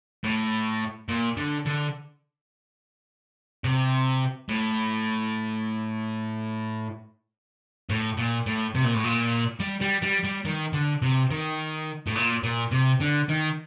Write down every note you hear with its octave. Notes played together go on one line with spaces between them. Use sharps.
A2
A#2
D3
D3
C3
A2
A2
A#2
A2
C3
A#2
A2
A#2
G3
G3
G3
G3
D#3
D3
C3
D#3
A2
A#2
A#2
C3
D3
D#3